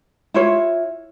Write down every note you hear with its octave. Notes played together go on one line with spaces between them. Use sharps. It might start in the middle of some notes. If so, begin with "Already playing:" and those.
E4 F4 C#5